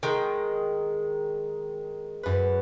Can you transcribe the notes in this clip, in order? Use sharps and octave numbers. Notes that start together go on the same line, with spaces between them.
D#3 G#3
F#2 B4